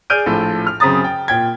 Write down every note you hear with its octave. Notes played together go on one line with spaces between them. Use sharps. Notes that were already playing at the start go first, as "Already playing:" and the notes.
G#4 D5 F6 G6 D7 D#7
A#1 A2 F4 A4
F6
F#2 C#3 C4 A#5 D#6 A6
G5
A#2 G5 G#6